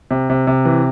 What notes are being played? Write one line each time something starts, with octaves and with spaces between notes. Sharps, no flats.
C3
C3
C3
E3